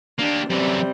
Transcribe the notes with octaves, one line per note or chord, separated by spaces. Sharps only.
A#3 D4 G4
F#2 C3 E3 G3